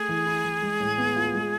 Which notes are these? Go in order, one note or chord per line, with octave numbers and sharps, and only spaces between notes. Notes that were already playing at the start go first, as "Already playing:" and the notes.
Already playing: A3 G#4
E3
E4
E3
G#3
A2
B3
F4
G#3